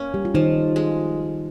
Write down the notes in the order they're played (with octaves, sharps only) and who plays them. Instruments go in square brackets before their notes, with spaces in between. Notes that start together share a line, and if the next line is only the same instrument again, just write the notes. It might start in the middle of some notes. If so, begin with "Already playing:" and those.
Already playing: [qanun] A#3 C#4
[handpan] G3 G4
F4
[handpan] D#3 D#4 [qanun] F3
[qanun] G#3